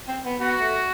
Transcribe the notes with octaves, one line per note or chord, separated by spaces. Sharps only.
C4
B3
B3 F#4
A3